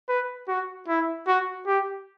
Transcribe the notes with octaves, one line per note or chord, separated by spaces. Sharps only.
B4
F#4
E4
F#4
G4